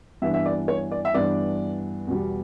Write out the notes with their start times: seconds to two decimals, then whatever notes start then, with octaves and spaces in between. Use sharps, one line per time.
0.22 G2 E3 B3 D4 E5
0.34 E5
0.46 D5
0.68 C#5
0.92 D5
1.05 E5
1.14 G2 E3 B3 D4 D5
2.07 E2 B2 G3